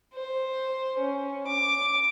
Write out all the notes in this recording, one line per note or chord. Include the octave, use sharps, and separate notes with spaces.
C5
C#4
D6